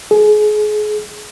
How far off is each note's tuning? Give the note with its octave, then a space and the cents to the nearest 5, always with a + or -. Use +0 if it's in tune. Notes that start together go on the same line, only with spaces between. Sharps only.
G#4 +30